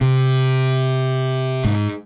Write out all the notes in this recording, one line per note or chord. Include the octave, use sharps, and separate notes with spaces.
C3
G#2